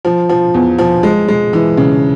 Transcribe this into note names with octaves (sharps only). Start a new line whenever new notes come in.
F3
F3
E2
F3
G#3
G#3
E3
C#3